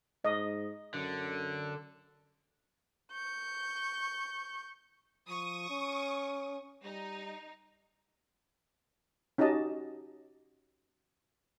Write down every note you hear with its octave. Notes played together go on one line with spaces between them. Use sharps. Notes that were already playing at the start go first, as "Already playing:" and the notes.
G#2 D#5
F#2 D3
C#6 G6
F3 C#6 D#6
C#4
G3 D#4
C#4 D#4 F#4 G4 D#5 A5